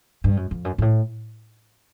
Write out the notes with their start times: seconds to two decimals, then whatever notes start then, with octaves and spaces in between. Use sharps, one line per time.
0.24 G2
0.37 F#2
0.51 F2
0.65 F#2
0.78 G#2
0.82 A2